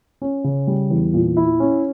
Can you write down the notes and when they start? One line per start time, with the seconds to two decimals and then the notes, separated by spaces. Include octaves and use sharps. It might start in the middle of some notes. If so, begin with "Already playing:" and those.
0.22 C#4
0.44 C#3
0.67 G3
0.90 E2
1.14 A#2
1.37 E4
1.60 C#4